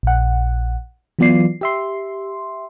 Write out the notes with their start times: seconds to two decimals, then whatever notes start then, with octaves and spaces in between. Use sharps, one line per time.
0.03 A#1 F#5
1.19 E3 F#3 B3 F4 D5 C7
1.61 G4 E5 C6